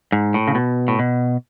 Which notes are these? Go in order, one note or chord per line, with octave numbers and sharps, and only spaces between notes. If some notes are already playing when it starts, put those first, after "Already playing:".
G#2
A2
C#3
B2
A2
B2